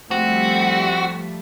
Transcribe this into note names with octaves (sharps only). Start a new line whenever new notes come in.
F3 G3 A3 C4 F#4